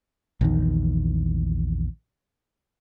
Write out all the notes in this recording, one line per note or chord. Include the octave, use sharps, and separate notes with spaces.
A#1 E2 D#3